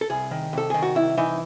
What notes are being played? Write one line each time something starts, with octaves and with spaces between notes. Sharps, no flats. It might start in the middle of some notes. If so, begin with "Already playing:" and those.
A4
C2 G#4
D#3
C2 A4
D#3 G#4
F#4
C2 E4
E3 D#4